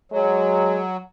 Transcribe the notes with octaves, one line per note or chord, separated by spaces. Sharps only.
F#3 G#3